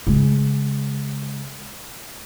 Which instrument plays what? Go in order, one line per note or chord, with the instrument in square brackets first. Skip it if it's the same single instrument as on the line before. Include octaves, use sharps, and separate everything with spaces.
[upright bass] C#3 G#3